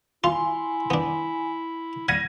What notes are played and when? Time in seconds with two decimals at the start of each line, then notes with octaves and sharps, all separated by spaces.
0.24 E4 F4 G#5 C6
0.90 B3 D4
2.08 G3 F#5 G#6 A#6 D#7